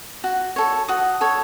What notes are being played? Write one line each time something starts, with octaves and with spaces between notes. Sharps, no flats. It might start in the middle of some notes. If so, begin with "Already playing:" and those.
F#4
A4 C#5
F#4 D#6
A4 C#5